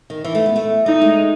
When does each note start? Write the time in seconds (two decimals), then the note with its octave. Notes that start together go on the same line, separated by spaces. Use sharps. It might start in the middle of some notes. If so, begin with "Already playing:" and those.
0.10 D#3
0.24 E3
0.35 A3
0.46 B3
0.56 A3
0.86 A3 D#4
1.01 G#3